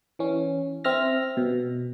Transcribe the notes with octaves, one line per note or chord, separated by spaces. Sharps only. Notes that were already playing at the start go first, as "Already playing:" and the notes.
E3 C#4
C4 E5 F6 A#6
B2